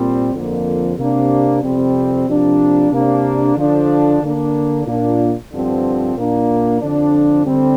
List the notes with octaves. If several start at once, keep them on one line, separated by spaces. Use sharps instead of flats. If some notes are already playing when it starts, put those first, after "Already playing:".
Already playing: A#2 G3 C4
F2 D3 A#3
C3 A#3 D4
F2 C3 G3 C4
C3 F3 A#3 D4
C3 A#3 D4
D3 F3 D4
D3 A#3 D4
A#2 A#3 D4
G2 D3 F3 C4
A#2 A#3 D4
F2 D3 F3 D4
D3 G3 C4